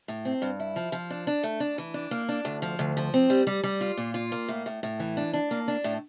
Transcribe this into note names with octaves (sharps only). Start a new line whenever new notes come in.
A2
C4
G2
E4
F3
F3
D4
D4
A3
D4
E3
D4
A#3
D4
D2
F3
D2
F3
C4
G3
G3
G3
F4
A#2
F4
A#3
A2
A2
A2
E3
D4
D4
A#3
D4
A2